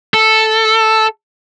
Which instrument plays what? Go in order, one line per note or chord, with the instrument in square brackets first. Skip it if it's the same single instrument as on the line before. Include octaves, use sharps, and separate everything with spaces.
[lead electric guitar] A4